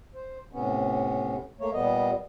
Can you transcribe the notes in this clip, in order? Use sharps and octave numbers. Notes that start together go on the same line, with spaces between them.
C5
A2 C3 B3 C#4
A3 A#3 C#5
A#2 G3 B3 D#5